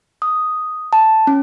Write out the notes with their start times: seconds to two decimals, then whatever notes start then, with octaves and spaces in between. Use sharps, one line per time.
0.22 D#6
0.93 A5
1.27 C#4